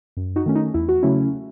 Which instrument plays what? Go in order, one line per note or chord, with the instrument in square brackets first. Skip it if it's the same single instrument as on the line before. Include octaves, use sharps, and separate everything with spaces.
[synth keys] F#2
D#4 F#4
D#3 A3 C#4
D#4
E2 E4
F#4
C#3 F#3 A3 C#4 E4